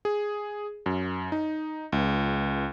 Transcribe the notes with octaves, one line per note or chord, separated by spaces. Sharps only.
G#4
F#2
D#4
C#2